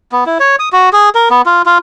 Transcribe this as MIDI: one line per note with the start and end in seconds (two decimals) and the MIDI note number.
0.12 0.24 59
0.26 0.38 64
0.40 0.56 73
0.59 0.69 87
0.72 0.89 66
0.93 1.09 68
1.15 1.29 70
1.30 1.42 59
1.46 1.62 65
1.66 1.78 65